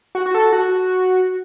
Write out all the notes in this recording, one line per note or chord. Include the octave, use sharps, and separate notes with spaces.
F#4
F#4
A4
F#4